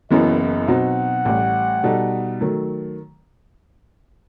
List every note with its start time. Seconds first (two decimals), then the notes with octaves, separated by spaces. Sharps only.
0.11 F#1 F#2 E3 B3 D#5
0.39 D#5
0.68 B2 F#3 C4 D#4 F#5
1.25 A1 A2 G3
1.83 B2 G3 D#4 A4
2.41 D#3 F#3 A3